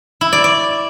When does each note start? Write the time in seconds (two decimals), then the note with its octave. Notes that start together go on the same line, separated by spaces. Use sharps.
0.21 E4
0.33 D5
0.44 D5